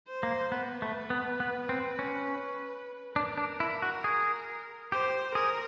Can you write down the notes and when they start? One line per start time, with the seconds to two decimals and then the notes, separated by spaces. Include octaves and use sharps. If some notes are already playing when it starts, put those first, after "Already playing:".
0.08 C5
0.23 A#3
0.52 B3 B4
0.82 A3
1.10 B3
1.40 B3
1.69 C4
1.99 C#4
3.16 D4 A#4
3.38 D4
3.60 E4
3.82 F#4
4.04 G#4
4.92 G4 C5
5.35 G#4 A#4